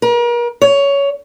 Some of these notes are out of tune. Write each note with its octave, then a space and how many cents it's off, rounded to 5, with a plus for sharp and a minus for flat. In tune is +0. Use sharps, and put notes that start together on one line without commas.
A#4 +40
C#5 +15